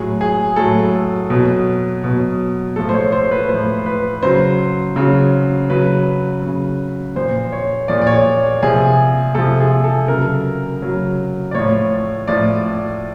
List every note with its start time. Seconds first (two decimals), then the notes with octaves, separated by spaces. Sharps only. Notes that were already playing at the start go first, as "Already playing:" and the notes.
Already playing: A2 F#3 G#4
0.21 G#4
0.56 A2 F#3 A4
1.30 B2 F#3
2.04 B2 F#3
2.76 A2 F3 A4
2.89 C5
2.94 C#5
3.12 C5
3.31 B4
3.49 A2 F3 C5
3.86 B4
4.23 C#3 F#3 C5
4.96 C#3 F#3
5.70 C#3 F#3 B4
6.42 C#3 F#3
7.15 A#2 F3 C5
7.52 C#5
7.88 A#2 F3 D5
8.01 D5
8.07 C#5
8.63 C3 F3 G#4
9.35 C3 F3 A4
9.60 G#4
9.84 A4
10.08 C#3 F#3 A#4
10.82 C#3 F#3
11.51 D5
11.54 A2 F3 C#5
12.28 A2 F3 D5